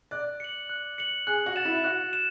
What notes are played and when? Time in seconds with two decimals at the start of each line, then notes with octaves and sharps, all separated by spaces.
0.11 D5 F#6
0.40 C#7 F#7
0.69 F#6
0.98 C#7 F#7
1.27 G#4 F#6
1.46 F#4
1.56 A6 E7
1.65 E4
1.84 F#4 F#6
2.13 E7